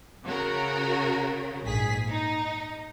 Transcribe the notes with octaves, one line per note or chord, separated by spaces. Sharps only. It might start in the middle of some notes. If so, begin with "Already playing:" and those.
C#3 F#4 A#4
A#1 G#2 G#4 B6
D#4